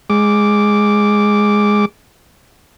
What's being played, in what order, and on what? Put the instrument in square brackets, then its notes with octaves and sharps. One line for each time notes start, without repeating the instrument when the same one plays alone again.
[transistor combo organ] G#3 D6